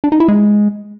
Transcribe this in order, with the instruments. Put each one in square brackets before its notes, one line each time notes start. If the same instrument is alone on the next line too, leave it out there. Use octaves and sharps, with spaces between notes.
[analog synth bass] D4
D#4
E4
G#3